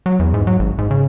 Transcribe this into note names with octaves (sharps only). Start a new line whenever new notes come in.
F#3
E2
G#2
F#3
G#1
G#2
C#3